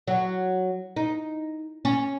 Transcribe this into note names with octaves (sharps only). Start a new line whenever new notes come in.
F#3
D#4
C#4